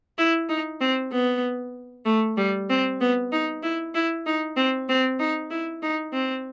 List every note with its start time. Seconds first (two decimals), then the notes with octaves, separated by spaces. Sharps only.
0.18 E4
0.49 D#4
0.81 C4
1.12 B3
2.06 A3
2.37 G3
2.70 C4
3.01 B3
3.32 D#4
3.63 E4
3.95 E4
4.26 D#4
4.57 C4
4.89 C4
5.20 D#4
5.51 E4
5.83 D#4
6.13 C4